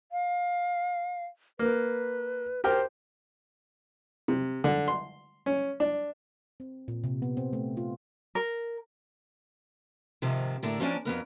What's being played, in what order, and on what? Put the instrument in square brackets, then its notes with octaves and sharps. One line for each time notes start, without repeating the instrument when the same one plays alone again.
[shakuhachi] F5
[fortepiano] A#3 [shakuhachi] B4
[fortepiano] G4 A#4 G5 [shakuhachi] C5
[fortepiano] C3
D3
C6
C#4
D4
[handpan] C4
A#2
C3
B3
C4
A3
F4
[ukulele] A#4
[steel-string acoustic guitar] G#2 C3 D#3 F3
A2 D3 A#4
F3 A#3 C#4 D4 G#5
F2 E3 B3 A#4